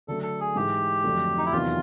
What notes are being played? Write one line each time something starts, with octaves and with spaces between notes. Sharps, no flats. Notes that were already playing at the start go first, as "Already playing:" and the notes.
D3 F#3 A3 A4
A4
G#4
G#2 E3 G#3 G4
F2 D3 F#3 A3
D#4
E4
E2 C3 D#3 F#3 B3 F4